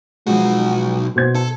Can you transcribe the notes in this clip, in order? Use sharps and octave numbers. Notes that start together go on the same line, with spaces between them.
B1 F3 G#3 F#4
B2 C5 G#6
A4